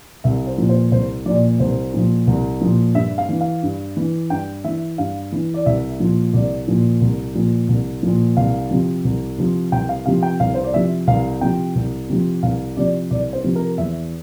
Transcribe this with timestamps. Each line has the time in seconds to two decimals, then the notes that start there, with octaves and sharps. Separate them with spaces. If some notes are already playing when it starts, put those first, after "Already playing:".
0.24 C2 E5
0.47 C5
0.58 A#2 F3
0.69 C5
0.92 C2 C5
1.26 A#2 F3 D5
1.60 C2 C5
1.94 A#2 F3
2.27 C2
2.61 A#2 F3
2.95 G2 E5
3.18 F5
3.29 E3
3.41 F5
3.63 G2
3.97 E3
4.30 G2 G5
4.64 E3 E5
4.98 G2 F5
5.32 E3
5.54 D5
5.66 C2 E5
6.00 A#2 F3
6.33 C2 D5
6.67 A#2 F3
7.01 C2
7.35 A#2 F3
7.69 C2
8.03 A#2 F3
8.37 C2 F5
8.71 C3 F3
9.05 C2
9.38 C3 F3
9.72 C2 G5
9.89 F5
10.06 C3 F3 F5
10.23 G5
10.40 C2 F5
10.54 C5
10.64 D5
10.74 C3 F3 E5
11.07 C2 F5
11.41 C3 F3 G5
11.75 C2
12.09 C3 F3
12.43 C2 F5
12.77 C3 F3 D5
13.11 C2 D5
13.33 C5
13.44 C3 F3
13.56 A#4
13.78 E2 E5